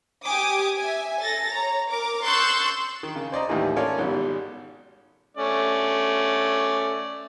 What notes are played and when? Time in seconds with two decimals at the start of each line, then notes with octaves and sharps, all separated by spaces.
0.24 G4 G#5 D6 D#6
0.77 E5 G#5
1.21 A4 A6 A#6
1.52 C#5 A#5
1.90 A#4 D6
2.24 C6 C#6 E6 F#6 G6 A6
3.03 D#3
3.16 C#3
3.32 C5 D5 D#5 A#5
3.48 D#2 A2 D#3 E3 G3
3.76 C#4 F4 A4 A#4 C#5 D5
3.99 G#1 G#2 B2 G3
5.37 A3 C#4 D5